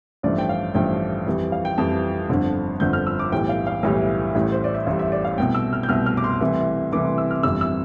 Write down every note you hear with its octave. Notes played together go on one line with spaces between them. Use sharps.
A1 G2 F3 A3 D5
G5
F5
A1 G2 F3 A3 G5
F2 E3 G3
F5
G5
F2 E3 G3 A5
G1 F2 D3 F3
G1 F2 D3 F3 G6
F6
E6
D6
B1 A2 E3 G3 G5
F5
F5
B1 A2 E3 G3 E5
A1 A2 G3
C5
D5
E5
A1 A2 G3 F5
E5
D5
F5
C2 B2 A3 G5
E6
F6
G6
C2 B2 A3 F6
F6
D6
C6
C2 C3 E3 A3
C2 C3 E3 A3 D6
C6
E6
F6
G1 F2 C3 E3 G3 E6
E6